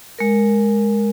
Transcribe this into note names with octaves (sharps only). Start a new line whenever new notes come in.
G#3 A#4